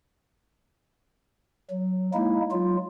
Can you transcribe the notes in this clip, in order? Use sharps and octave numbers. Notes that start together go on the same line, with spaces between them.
F#3
G#3 A#3 D#4 E4
F#3 F4